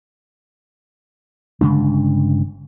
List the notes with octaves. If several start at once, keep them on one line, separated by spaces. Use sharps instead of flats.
G1 C#3 G#3 D4